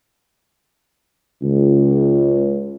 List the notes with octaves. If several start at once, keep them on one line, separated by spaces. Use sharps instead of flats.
C#2